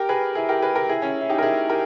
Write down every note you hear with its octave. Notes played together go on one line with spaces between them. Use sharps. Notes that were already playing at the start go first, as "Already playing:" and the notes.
Already playing: G4 A#4
G#4 B4
E4 G#4
G4 A#4
G#4 B4
G4 A#4
E4 G#4
C#4 E4
E4
D#4 G4
A#4
E4 G#4
G4 A#4